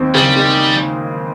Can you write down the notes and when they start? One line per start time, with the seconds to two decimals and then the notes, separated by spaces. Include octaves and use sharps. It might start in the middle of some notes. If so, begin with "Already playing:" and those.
Already playing: D#2 G#3 C4
0.15 C#3 G3
0.36 G#3